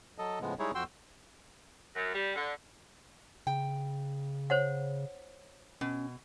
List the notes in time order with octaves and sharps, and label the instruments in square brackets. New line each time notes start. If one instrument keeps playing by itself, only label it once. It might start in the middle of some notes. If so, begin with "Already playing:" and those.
[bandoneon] F#3 A4 D#5
A2 C#3 F3 G#3 B3
G3 G#3 D#4 E4 G#4 C#5
F2 F#4 G5 C6 E6
[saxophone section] F#2
G3
D3
[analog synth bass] C#3 [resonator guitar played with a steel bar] G5
[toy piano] C5 C#5 F#5
[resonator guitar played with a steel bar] B2 [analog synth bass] C#4